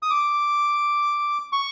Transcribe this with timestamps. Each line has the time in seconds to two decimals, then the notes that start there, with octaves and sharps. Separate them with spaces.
0.02 D#6
0.10 D6
1.53 C#6